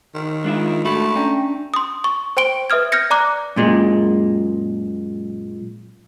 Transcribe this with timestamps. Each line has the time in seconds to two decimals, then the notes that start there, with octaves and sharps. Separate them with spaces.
0.14 D#3
0.44 G#3 D4 F4 E5
0.85 A2 A3 D4 F#4 B5
1.16 C#4 D4 G5 A#5
1.74 C6 D#6
2.04 C#6
2.37 C5 G5 C6 D7 G7
2.70 B4 E5 D#6 F6 G#6
2.92 F6 G6 G#6 A#6 C#7
3.10 D5 A#5 D6 F#6
3.56 F#2 A#2 G#3